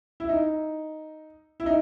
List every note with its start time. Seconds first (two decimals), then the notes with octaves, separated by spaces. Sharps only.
0.20 E4
0.29 D#4
1.60 E4
1.66 D#4